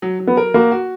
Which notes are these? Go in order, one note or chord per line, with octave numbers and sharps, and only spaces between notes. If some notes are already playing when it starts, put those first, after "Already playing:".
F#3
F#3
B3
A#4
A#3 F#4
F#4